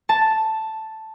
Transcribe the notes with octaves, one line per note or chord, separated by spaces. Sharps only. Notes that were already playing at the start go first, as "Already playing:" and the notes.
A5